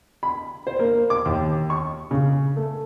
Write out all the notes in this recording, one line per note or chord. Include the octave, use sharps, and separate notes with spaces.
B5
C5
A#3
D6
D#2
C#6
C#3
A3